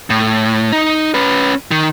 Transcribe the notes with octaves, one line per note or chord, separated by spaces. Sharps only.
A2
D#4
C#4 B4
D#3